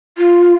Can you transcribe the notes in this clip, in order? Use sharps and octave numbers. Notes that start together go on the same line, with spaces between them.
F4